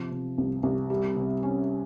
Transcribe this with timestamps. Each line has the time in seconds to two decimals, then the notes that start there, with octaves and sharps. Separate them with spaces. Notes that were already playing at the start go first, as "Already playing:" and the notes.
Already playing: C3 F3
0.11 C3
0.38 C2
0.63 C2
0.90 G3
1.16 C3
1.43 C#4